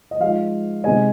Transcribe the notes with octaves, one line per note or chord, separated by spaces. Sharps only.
D#5
F3 G#3 D#4 F5
C3 G#3 D#4 G#5